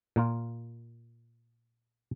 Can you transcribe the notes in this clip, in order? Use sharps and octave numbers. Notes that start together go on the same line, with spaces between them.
A#2 A#3 F4